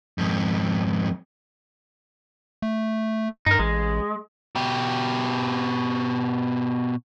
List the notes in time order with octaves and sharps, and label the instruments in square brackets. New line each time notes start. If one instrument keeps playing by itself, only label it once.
[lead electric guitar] F2 G#2
[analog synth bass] A3
[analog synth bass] G2 [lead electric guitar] D#4 A#4
[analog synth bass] A1 [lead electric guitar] G#3
[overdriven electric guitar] B2 G4